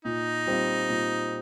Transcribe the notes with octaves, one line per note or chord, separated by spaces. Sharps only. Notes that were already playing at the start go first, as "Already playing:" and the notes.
A#2 D#4
G3 C4 F4
A#2